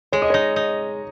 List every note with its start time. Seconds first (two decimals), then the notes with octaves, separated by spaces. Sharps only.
0.12 G#3 C#5
0.22 D#5
0.30 D#4 C#5
0.56 D#4